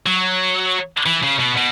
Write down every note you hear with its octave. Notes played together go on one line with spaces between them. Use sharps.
F#3
E3
C#3
B2
B2